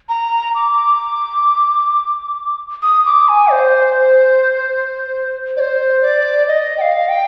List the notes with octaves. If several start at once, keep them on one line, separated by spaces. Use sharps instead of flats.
A#5
D6
D#6
D6
G#5
C5
D5
C5
D5
D#5
G5
F5
G5